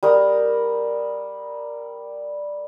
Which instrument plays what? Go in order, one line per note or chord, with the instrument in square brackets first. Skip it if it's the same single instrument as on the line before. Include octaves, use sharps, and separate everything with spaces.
[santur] G3 A#4 D#6